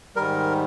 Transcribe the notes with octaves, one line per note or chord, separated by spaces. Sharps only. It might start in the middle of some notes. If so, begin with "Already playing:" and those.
G#2 D#3 G3 A#4